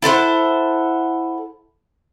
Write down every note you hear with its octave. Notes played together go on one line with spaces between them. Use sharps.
E4 A4 C5 F#5